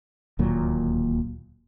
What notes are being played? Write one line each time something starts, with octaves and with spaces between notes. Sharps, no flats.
D1 D#2 A#2 F#3